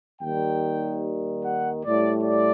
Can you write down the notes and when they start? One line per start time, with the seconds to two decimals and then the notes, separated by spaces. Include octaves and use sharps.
0.19 D#2 D#3 G3 G5
1.42 F#5
1.83 A2 G3 D5
2.23 D5